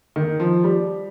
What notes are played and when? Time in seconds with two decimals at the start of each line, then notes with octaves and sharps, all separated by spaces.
0.16 D#3
0.40 F3
0.64 G3